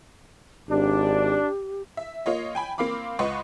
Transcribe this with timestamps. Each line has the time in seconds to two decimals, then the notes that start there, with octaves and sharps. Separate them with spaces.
0.69 G#1 D4 G4
1.97 E5
2.26 A#3 F4 C#5 D#5
2.55 G5 G#5 B5
2.78 A#3 C4 F5 B5 D6
3.19 C#2 B4 D#5 F#5 C6 C#6